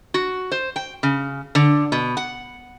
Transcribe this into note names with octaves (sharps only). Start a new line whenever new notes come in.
F#4
C5
G5
C#3
D3
B2
F#5